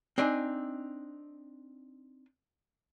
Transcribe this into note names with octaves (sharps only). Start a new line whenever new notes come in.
C4 D4 D#4 G#5